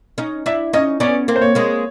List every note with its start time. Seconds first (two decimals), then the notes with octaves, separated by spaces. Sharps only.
0.18 C#4 D#4
0.46 D4 E4 E5
0.73 C#4 D#4 D#5
1.00 B3 C#4 D5
1.28 A#3 C4
1.36 C5
1.41 C#5
1.55 G#3 A#3